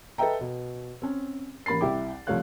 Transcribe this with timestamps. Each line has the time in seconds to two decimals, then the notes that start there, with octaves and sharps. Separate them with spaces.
0.18 A4 B4 D#5 E5 G5 A#5
0.41 B2
1.02 C4 C#4
1.66 A1 A#3 B5 A6 C7
1.81 C2 E4 G5 D6
2.27 C2 F3 A3 C#5 F5 F#6